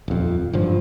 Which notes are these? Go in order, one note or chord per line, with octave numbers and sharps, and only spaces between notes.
D#1 F2
G#1 G2 F3